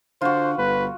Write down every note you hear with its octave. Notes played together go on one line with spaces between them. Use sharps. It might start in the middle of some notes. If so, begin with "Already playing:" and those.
D3 F4 F#4 C5
G1 B4